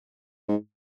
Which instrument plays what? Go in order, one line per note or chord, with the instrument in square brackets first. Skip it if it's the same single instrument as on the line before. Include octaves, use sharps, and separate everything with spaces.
[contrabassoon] G#2